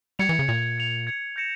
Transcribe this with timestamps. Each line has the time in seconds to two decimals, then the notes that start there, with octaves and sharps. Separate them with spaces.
0.19 G3 G#6 C#7 F7
0.29 E3
0.39 C#3
0.48 A#2 G#6 C#7 F7
0.78 G#6 C#7 F7
1.07 G#6 C#7 F7
1.36 G6 A#6 C#7 E7